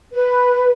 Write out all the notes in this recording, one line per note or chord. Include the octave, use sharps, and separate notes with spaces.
B4